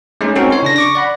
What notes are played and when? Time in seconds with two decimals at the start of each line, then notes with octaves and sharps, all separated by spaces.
0.21 G#3 A3 C#4 D#4
0.36 C4 C#4 D#4 F#4 A4 A#4
0.50 E4 C#5 C6
0.63 C#3 D4 A#6
0.76 C#6 D6 A#6
0.95 D5 F#5 B5